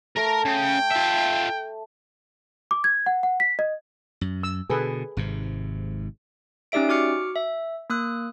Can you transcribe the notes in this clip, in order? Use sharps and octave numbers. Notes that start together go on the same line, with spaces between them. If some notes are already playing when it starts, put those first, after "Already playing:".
A3 A#4 A#5
C#3 G5
F4 E5
D6
G#6
F#5
F#5
B6
D#5
F#2
E6
B2 D3 G#4 A4 B4
G#1 G#2 C3
C#4 D#4 G4 D5 E5 D7
F#4 D6 F6 C#7
E5
A#3 D#6 F#6